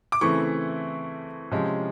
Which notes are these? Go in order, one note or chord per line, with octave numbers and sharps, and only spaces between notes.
D6
C#3 E3 A3 C4 E4 C#6
C3 F3 G#3 C#4